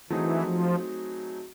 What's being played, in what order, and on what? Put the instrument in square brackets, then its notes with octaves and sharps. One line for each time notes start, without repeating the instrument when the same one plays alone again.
[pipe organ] E3 [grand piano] F#3 A3 C4 D#4 G#4
[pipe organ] F3